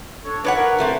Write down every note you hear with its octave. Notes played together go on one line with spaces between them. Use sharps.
D4 A4 C#5
D4 B4 C#5 F#5
A#4
F#3 A3 C4